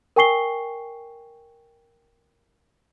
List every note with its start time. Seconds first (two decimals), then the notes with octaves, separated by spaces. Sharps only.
0.16 A#4 G5 G#5 C#6 C7 G7